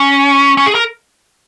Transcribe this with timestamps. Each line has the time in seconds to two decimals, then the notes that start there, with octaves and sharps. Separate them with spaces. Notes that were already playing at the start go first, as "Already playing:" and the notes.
Already playing: C#4
0.57 C#4
0.66 G#4
0.75 A#4